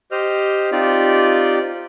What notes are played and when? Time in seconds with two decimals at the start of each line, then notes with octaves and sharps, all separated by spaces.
0.12 G4 C5 D#5 F6
0.72 C4 D#4 F4 G4 D5